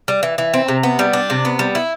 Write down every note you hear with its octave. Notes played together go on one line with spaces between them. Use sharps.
G3
E3
E3
C4
C3
B3
G3
D4
C3
B3
G3
E4